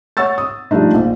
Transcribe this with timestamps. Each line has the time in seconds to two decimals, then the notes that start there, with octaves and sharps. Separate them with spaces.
0.17 C#5 F#5 C#6 E6 A6
0.38 D#6
0.71 F3 G3 A3 D4 D#4
0.94 A#1 A#2